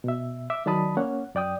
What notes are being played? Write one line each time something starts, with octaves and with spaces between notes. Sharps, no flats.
B2 E5
E5 D6
D#3 F#3 D5 A5 B5 D#6
A#3 C#4 C#5 F#5
F#2 D5 G5 D#6